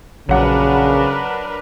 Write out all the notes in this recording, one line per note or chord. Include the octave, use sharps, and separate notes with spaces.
A#1 C#3 F#3 D4 A#4 B4 F#5